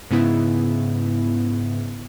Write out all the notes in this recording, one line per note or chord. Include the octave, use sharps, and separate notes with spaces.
G#2 C#3 B3 E4